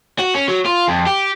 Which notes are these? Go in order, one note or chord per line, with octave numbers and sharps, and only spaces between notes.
F#4
C#4
F#3
F4
F2
G4